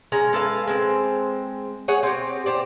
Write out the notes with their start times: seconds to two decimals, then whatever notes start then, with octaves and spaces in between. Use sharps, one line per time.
0.12 G#3 C#4 A#5
0.33 G#3 A4 B4 F5
0.67 G#3 C4
1.88 G#4 C#5 F#5
2.03 C4 G4
2.46 G4 C5 D5